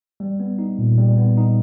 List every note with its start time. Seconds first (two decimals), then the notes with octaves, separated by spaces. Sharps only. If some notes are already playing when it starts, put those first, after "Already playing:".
0.20 G3
0.40 B3
0.59 D#4
0.78 A#2
0.98 G3
1.17 B3
1.37 D#4